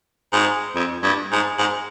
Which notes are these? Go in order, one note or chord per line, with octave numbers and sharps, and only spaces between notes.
G#2
F2
G2
G#2
G#2